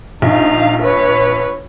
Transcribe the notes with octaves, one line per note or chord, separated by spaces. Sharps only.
A#1 D#4 F5
B4 C#5